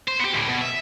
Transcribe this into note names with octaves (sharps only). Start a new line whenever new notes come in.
C5
B3 G4
D2 A2
B2
E5